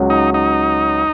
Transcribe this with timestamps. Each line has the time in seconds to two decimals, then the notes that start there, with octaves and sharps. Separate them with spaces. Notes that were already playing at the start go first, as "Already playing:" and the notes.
Already playing: C#2 C#3 F#3 C#4 F#4
0.10 D#4
0.34 D#4